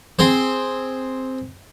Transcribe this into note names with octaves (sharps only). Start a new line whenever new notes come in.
C4 G#4 C5